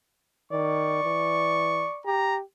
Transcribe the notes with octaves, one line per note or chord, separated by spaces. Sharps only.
D#3 D5 C#6
E3
G4 A#5